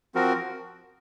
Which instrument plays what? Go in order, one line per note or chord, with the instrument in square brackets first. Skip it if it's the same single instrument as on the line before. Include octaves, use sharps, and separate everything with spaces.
[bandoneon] F3 C4 F#4 A#4